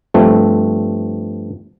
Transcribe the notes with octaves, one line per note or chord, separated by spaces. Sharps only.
G2 F3 A3 C4